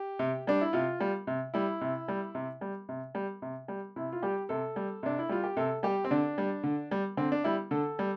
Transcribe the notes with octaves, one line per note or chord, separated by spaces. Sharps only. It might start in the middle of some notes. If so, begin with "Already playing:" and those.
Already playing: G4
C3
G3 D4
E4
C3 F4
G3
C3
G3 E4
C3
G3
C3
G3
C3
G3
C3
G3
C3 E4
F4
G3 G4
C3 A4
G3
C3 D4
E4
G3 F4
G4
C3 A4
G3 G4
C4
D3 D4
G3
D3
G3
D3 C4
D4
G3 E4
D3 A4
G3